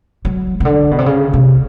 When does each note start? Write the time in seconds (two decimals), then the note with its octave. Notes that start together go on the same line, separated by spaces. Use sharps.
0.25 F#3
0.60 C#3
0.65 D3
0.91 B2
0.98 C3
1.06 C#3
1.34 C3